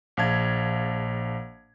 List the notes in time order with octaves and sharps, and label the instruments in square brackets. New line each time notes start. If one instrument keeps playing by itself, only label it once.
[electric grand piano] A#1 F5 A5 G#6